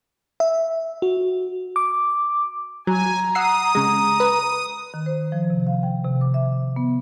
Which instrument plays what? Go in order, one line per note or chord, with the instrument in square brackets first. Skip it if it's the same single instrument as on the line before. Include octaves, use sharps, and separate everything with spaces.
[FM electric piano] E5
F#4
D6
[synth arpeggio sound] F#3 [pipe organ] G#5 [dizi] A#5
[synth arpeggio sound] F#5 E6 C7 [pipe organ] D#6
[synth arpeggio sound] C#3 G#3 [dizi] A#5
[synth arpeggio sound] B4
[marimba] D#3
C5
F3
C3
F5
G5
C3
D6
E5
B3